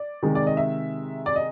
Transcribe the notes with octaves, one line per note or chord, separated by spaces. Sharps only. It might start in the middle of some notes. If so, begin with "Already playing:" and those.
Already playing: D5
C3 D#3 G#3
D5
D#5
E5
D5
D#5